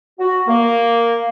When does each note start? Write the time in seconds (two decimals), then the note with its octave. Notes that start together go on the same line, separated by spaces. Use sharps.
0.19 F#4
0.48 A#3